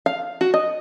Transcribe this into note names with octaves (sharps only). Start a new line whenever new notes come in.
F5
F#4
D#5